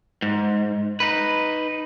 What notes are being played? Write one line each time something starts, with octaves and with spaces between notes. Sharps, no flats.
G#2
D#4 B4